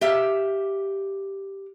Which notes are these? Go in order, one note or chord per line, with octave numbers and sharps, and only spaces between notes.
G4 E5 F5